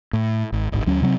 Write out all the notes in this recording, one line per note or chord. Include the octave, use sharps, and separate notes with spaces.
A2
G#1
D1 G#1
D2 F#3 C#4
C3 F#3 A3 C4